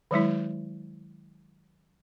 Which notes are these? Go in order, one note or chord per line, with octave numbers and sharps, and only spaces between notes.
D#3 F#3 G#3 E4